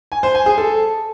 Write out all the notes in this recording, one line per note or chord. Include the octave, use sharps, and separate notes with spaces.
G#5
C5
G#5
G#4
A4